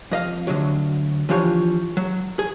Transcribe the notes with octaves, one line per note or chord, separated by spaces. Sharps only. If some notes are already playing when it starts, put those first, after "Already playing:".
F2 D#5 F5
D2 D3 F#3
E3 F3 D4 F4 G4 C#5
F#3
G#4